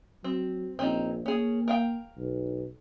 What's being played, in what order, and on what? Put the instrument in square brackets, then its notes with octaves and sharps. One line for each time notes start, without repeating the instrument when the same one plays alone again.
[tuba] F#3 [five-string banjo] C4
[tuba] A#1 [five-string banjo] C4 C#4 D#4
[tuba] A#3 [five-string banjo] C#4 G#4
[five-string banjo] A#4 F5 G5
[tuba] B1